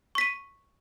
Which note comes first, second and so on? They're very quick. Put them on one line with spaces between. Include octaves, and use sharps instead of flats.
C#6 B6 D#7